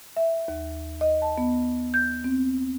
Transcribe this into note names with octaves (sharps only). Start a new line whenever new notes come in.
E5
D#2
D#5
A5
B3
G6
C4